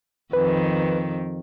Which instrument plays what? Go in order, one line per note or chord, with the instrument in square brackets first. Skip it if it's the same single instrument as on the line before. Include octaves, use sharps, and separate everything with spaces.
[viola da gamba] F2 D#3 [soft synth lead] B4